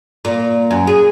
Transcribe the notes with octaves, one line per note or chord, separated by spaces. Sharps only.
A#2
F#2
G#4